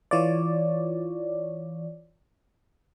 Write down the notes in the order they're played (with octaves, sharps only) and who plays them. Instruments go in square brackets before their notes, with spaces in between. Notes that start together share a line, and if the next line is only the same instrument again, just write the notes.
[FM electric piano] E3 F4 C#5 D5